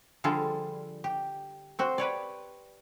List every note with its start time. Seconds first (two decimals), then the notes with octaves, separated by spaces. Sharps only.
0.24 D3 F3 G3 F4 G#4 A4
1.04 G4
1.79 C4 F#4 C5
1.98 G4 B4 C#5 D5